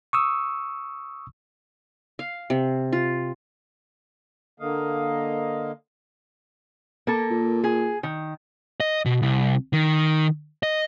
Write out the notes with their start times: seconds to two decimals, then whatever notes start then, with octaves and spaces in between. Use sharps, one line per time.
0.13 C#6 D#6 E6
2.19 F5
2.50 C3
2.93 F4
4.60 D3 A#3 D#5 F5
7.07 A#3 A4
7.31 A#2
7.64 G#4
8.03 D#3
8.80 D#5
9.06 B2
9.22 C2
9.73 D#3
10.63 D#5